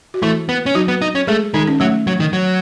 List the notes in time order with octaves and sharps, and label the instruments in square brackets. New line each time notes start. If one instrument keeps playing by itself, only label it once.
[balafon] F#4
[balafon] E3 E4 [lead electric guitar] A3
[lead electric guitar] B3
C#4
[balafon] F#3 F#4 [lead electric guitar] D#4
[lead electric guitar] B3
D#4
C#4
[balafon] G#3 G#4 [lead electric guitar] A3
[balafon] D#3 D#4 [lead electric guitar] G#3
[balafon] C#4
[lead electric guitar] F#3 [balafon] A3
[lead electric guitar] F#3
D#3
F#3